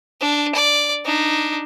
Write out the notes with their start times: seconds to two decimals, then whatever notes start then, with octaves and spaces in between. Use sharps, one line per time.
0.21 D4
0.55 D5
1.05 D4 D#4